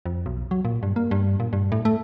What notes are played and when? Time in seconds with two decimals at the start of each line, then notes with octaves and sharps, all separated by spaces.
0.06 F2
0.26 B1
0.51 F#3
0.65 A#2
0.83 G2
0.96 A#3
1.11 G2
1.40 A#2
1.53 G2
1.72 A2
1.85 A3